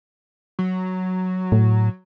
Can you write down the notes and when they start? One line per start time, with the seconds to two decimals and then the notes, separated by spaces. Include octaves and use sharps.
0.59 F#3
1.52 A2